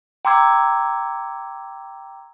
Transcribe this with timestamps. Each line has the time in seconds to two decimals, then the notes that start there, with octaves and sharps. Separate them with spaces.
0.25 G5 A#5 C6 D6 E6 G#6